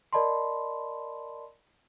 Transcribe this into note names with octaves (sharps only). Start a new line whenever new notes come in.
A#4 D5 D#5 A5 B5 C6